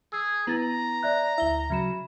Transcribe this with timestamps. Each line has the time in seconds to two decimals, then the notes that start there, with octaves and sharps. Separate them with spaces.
0.13 G#4 E6
0.47 B3 E4 A#5 A6
1.03 D5 E5 F#6
1.38 D2 E4 E5 G7
1.70 C#3 F#3 E5 B5 E7